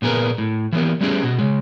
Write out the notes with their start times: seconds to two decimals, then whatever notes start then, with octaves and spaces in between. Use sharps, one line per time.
0.02 A#2 B3 G#4 A#4 B4
0.38 A2
0.72 E3 A#3 B3 G4
1.01 G3 A3 B3 C#4 G4 G#4
1.23 B2 F#4
1.39 C#3 G#3